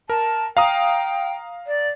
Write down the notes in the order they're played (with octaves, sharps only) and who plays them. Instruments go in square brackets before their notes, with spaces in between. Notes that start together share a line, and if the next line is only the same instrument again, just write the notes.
[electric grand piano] A#4 [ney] A5
[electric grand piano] F5 A#5 D#6 [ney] G5
[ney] D5